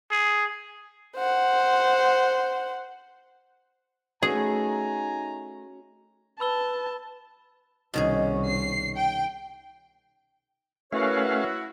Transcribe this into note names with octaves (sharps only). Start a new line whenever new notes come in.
G#4
C5 F#5
A3 C#4 D#4 F#4 G#4 B4 G#5 A#5
B4 A5 B5 E6 G7
C2 B2 D#3 C#4 G#4
C7
G5
A3 C#4 E4 F#4 A#4 B4 C#5 F5